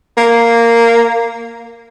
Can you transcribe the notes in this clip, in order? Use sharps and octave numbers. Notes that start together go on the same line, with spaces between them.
A#3